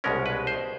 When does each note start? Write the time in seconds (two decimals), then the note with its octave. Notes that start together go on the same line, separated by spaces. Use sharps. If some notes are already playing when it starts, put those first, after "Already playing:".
0.04 C2 B2 G#3 C#4 A#4
0.26 B4
0.47 C5